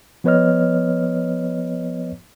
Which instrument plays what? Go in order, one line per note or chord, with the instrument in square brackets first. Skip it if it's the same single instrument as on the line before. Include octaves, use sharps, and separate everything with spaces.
[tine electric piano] F3 B3 B4 C#5 D#5 F6